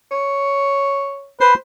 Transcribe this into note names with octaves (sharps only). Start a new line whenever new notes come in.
C#5
B4 C5